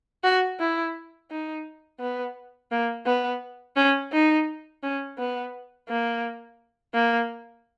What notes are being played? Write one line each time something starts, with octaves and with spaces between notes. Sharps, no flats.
F#4
E4
D#4
B3
A#3
B3
C#4
D#4
C#4
B3
A#3
A#3